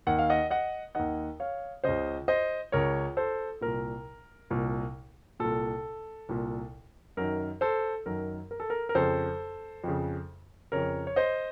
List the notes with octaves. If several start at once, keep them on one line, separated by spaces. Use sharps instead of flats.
D#2 D#3 F#5
F5
D#5 F#5
D#5 F#5
D#2 D#3 D#5 F#5
C#5 F5
C#2 C#3 C5 D#5
C5 D#5
C#2 C#3 A#4 C#5
A4 C5
C2 A#2 A#4
C2 A#2
C2 A#2 A4
C2 A#2
F#2 D#3 A#4
A4 C5
F#2 D#3 A#4
A#4
A4
A#4
A#4
F2 C#3 A4 C5
F2 C#3
F2 C#3 A#4 C#5
C#5
C5 D#5